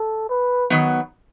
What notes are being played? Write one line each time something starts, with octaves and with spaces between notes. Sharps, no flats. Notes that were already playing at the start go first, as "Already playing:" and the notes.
Already playing: A4
B4
D#3 F#3 B3